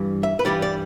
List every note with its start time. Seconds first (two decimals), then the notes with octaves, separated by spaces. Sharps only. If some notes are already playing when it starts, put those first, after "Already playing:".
Already playing: G2 E3 G3
0.23 E5
0.39 B4
0.45 G2 E3 G3 D5
0.62 D5